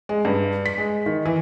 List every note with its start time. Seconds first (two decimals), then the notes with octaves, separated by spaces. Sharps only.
0.09 G#3
0.25 G2
0.66 B6
0.78 G#3
1.06 D#3
1.25 E3